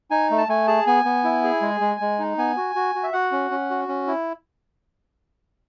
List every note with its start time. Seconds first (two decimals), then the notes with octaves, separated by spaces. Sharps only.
0.11 D#4 G#5
0.31 A3
0.38 A5
0.48 A3 G#5
0.67 G#4 A5
0.87 B3 G#5
1.05 B3
1.24 E4
1.44 G#4
1.62 G#3
1.81 G#3
2.01 G#3
2.19 D#4
2.38 B3 G#5
2.57 F#4
2.75 F#4
2.95 F#4
3.03 E5
3.13 F#4 F#5
3.32 C#4
3.51 C#4
3.70 F#4
3.88 C#4
4.07 E4